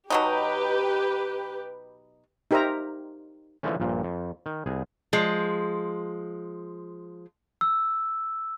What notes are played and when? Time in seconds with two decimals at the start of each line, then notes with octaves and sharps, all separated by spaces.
0.10 B2 F#3 D#4 G4 B4
2.51 D#4 G4 A#4 C5 E5 A#5
3.63 D3 E3 F3 G#3 A3 C#4
3.80 A#1 G2 A#2
4.03 F2
4.46 D#3
4.66 C2 G#4
5.13 F3 G#3
7.61 E6